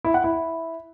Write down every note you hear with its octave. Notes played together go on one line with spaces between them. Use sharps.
E4
F#5
E4